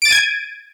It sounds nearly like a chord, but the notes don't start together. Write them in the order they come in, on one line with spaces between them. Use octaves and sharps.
D7 A6 D#7 G#6